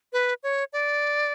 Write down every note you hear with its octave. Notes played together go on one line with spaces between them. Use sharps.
B4
C#5
D5